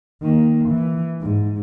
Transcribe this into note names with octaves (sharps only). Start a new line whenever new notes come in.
D#3 A#3
E3
G#2